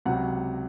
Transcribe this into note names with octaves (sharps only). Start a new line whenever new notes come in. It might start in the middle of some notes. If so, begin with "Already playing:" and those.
C#2 C3 F#3 F#5